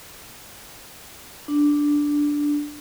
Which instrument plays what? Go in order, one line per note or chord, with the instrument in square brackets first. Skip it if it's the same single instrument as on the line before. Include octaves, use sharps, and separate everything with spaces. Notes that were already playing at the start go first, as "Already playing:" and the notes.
[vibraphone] D4